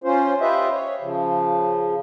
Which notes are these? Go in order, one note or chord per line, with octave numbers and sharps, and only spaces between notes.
C#4 F4 C5
F4 G4 B4 C5 D#5 E5
C#5
C#3 F3